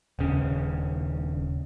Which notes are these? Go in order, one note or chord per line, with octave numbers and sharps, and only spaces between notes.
D#1 C#3